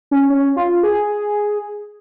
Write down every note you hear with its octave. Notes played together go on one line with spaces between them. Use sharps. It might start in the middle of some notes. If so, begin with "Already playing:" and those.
C#4
C#4
F4
G#4